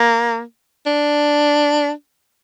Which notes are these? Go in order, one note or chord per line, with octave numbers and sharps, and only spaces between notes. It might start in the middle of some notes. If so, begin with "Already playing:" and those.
Already playing: A#3
D4